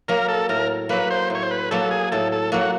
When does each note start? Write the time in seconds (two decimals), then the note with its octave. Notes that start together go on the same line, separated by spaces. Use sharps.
0.08 F#3 A#3 A#4
0.29 A4
0.49 A2 A#4
0.89 F#3 A#3 B4
1.11 C5
1.30 A2
1.35 C#5
1.43 C5
1.51 B4
1.71 F#3 A#3 A4
1.91 G#4
2.12 A2 A4
2.32 A4
2.52 F#3 A#3 F#4